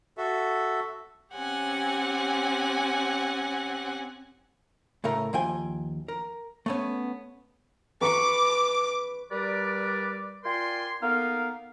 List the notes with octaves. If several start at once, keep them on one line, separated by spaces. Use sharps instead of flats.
F#4 A4 E5
C4 C#4 G4 F#5 G#5
A2 C#3 A3 A#4
D#2 F3 G5 G#5
A#4
A3 B3 C#4
B4 B5 C#6 D6
G3 A#4 B4 D5
F4 A#4 D5 G5 G#5 C6
A#3 B3 D#4 A4 A#4 F5